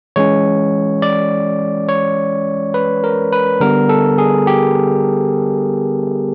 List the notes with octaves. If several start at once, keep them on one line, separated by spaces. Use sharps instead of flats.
E3 G#3 C#4 C#5
D5
C#5
B4
A#4
B4
D3 G3 B3 A#4
A4
G#4
G4